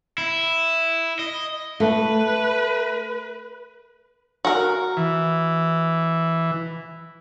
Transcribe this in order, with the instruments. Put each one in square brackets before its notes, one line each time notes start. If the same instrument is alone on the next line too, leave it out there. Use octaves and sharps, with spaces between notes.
[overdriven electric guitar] E4
D#5
[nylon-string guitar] A3 [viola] B4
[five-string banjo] F#4 A#4
[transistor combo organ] E3